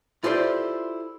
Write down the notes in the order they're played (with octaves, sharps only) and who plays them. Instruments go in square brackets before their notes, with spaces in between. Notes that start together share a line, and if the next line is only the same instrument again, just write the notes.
[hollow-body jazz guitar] E4 F4 G4 A4 C5 D5